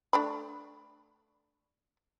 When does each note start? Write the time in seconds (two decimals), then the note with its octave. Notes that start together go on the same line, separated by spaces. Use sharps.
0.13 A3 D4 B5